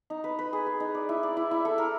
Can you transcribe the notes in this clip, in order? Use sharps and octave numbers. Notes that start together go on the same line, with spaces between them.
D#4
B4
B4
G#4
G#4
D#4
D5
E4
D5
E4
E4
A4
A#4